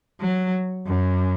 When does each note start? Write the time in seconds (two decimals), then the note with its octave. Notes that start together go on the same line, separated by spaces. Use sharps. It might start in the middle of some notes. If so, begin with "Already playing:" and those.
0.20 F#3
0.87 F#2